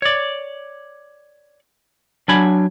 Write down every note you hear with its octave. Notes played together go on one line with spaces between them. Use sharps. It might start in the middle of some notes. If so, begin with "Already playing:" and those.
C#5 D5
F#3 D4 G#5 B5